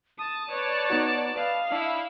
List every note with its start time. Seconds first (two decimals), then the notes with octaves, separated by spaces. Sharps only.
0.18 A5 D#6
0.51 B4 C#5 D5
0.90 B3 D#4 F#4
1.36 B4 D#5 F5
1.72 D4 E4 E5